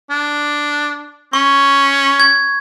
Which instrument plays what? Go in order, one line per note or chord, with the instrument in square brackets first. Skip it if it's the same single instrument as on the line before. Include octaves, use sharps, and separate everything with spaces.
[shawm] D4
[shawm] C#4 [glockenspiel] C#6
[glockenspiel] G#6